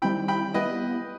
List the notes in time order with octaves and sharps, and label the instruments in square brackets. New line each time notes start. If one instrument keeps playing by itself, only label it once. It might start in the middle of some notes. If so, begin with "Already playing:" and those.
[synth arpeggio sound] D#3 G3 C4 E4 [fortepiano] G5 B5
[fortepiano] G5 B5
[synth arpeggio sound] G3 B3 E4 [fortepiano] B4 D#5